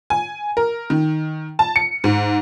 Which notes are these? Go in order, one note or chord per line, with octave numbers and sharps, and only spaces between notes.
G#5
A#4
D#3
A5
C#7
G#2